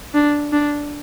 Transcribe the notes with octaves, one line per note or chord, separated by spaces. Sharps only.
D4
D4